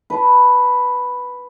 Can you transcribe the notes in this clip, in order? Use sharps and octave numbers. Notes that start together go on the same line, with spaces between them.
B4 A5 A#5 C6